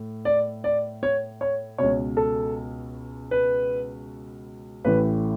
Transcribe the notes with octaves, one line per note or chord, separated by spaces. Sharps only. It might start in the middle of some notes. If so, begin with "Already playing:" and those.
Already playing: A2
D5
D5
C#5
C#5
C#2 B2 C#5
A4
B4
A1 A2 E3 B4